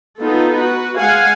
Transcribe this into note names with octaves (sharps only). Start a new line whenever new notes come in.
B3 D#4 F4 A4
F#4 B4
G#3 F5 F#5 G#5